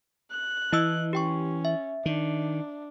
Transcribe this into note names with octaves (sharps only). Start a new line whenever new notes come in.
F#6
E3 E4 D#5 E6
C#4 G4 G5 C#6
E5
D#3 D4